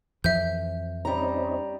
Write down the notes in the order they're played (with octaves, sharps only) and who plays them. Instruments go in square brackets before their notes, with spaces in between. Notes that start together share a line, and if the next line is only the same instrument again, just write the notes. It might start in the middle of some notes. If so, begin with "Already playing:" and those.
[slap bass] F2 E3 F3 [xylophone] E5 G6
[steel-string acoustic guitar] G3 A#5 [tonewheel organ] C4 C#4 D#4